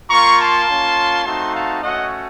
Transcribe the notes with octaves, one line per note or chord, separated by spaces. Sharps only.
A#3 F4 A#5 C#6
A5 C6
A#3 C#4 F4
A3 C4 D#4 F#4 A5 C6
F5 A5
A3 C#4 F#4 D#5 F#5